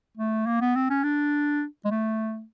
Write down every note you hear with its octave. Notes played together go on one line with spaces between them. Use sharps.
A3
A#3
B3
C4
C#4
D4
G#3
A3